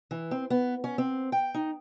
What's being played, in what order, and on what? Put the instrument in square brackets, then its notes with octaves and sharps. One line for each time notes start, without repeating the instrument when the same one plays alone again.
[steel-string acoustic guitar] E3
C4
B3
C#4
C4
G5
D#4